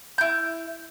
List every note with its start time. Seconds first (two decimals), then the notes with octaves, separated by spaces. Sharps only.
0.18 E4 G6